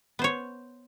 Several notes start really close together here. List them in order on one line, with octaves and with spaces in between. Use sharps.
B3 C5 C#5